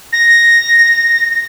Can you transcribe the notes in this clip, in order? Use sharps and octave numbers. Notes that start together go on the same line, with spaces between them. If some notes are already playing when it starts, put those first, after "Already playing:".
A#6